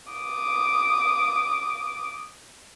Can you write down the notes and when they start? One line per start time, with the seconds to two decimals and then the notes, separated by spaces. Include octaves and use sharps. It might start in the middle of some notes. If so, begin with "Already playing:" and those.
0.12 D6 D#6